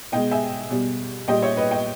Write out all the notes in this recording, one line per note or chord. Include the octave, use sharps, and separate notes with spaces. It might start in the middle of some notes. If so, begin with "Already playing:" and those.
B2 G#3 D#5 G5
E5 G#5
B2 G3
A#2 G3 D#5 G5
C#5 E5
B4 D#5
D#5 G5